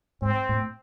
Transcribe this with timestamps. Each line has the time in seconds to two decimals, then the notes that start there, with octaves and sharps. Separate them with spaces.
0.22 G#2 C4
0.49 A2